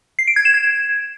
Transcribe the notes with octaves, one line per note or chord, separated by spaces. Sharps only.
C7
D7
G#6
E7
G#6